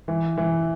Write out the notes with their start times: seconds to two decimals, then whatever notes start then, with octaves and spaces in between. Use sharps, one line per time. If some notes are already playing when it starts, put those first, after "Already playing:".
0.08 E3
0.37 E3